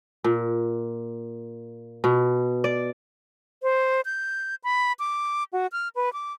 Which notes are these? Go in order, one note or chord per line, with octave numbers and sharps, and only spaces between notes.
A#2
B2
D5
C5
G6
B5
D6
F#4
F6
B4
D6